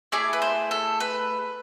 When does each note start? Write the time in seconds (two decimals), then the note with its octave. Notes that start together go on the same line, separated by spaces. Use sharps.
0.12 A3 E4 G#4 D5
0.33 B4
0.42 C5
0.71 A4
1.00 B4